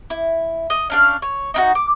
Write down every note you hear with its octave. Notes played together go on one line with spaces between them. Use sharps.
E4
D#5
C#4 D4 F5
C#5
D#4 E4 F#4
D6